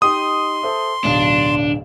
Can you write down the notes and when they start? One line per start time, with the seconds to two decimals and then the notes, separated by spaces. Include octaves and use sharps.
0.02 D#4 G4 D#5 C6 D#6
0.63 A4 C5 E5
1.04 D1 B1 D4 F5